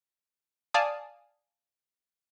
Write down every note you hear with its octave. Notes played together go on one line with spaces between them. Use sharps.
D5 F5 G#5 A5 D#6